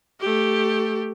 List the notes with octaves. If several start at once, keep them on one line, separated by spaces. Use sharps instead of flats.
A3 G4